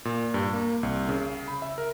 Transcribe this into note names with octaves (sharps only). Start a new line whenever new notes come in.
A#2
G2
A#3
C2
C#3
B5
E5
A#4